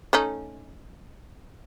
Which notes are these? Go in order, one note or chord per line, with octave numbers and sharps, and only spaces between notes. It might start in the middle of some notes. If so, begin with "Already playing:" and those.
A3 C#4 D#4